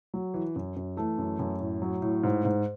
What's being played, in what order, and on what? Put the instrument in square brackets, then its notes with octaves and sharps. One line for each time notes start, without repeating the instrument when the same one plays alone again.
[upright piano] F#3
E3
F#2
F#2
E3 A3
F#2
F#2
A2
F#3
A2
G#2
G#2